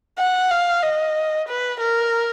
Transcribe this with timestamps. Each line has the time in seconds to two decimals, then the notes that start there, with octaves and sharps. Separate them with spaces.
0.19 F#5
0.51 F5
0.84 D#5
1.48 B4
1.81 A#4